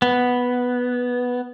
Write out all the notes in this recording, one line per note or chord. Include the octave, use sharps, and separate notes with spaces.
B3